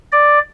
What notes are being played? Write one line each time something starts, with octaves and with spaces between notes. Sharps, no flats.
D5